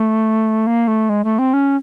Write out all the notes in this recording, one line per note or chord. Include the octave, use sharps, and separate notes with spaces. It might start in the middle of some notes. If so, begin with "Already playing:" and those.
Already playing: A3
A#3
A3
G#3
A3
C4
C#4